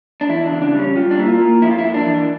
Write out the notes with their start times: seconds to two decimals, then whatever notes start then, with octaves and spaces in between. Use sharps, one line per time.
0.21 D4
0.29 E2 E4
0.46 D4
0.51 C#3
0.62 D4
0.74 G3 C#4
0.95 G3 F4
1.11 D4
1.18 A#3 E4
1.28 F4
1.40 A#3
1.62 F2 E4
1.71 F4
1.79 E4
1.84 A#3
1.94 D4
2.05 E3